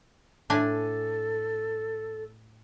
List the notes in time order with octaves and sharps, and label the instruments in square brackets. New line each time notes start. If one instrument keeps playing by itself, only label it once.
[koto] A2 D4 G#5 [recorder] A4